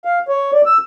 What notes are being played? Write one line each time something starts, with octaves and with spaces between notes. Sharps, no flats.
F5
C#5
D5
E6